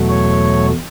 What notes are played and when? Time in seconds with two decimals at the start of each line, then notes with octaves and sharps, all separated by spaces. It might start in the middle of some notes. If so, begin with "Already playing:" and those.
Already playing: E2 B2 F#3 A3
0.09 C#5